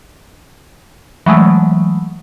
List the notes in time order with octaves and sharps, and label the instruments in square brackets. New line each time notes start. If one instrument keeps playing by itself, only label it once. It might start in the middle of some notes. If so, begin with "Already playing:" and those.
[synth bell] E3 F#3 G#3 A3